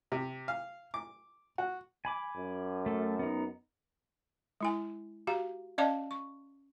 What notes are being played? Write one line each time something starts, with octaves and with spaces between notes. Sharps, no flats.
C3
F5
D6
F#4
G#5 B5 D6
F#2
A3 A4
B3 D#4
G#3 E4 G#5
F#4 G4 F5 A#5
C#4 D5 D#5 F5 A5 D6
C#6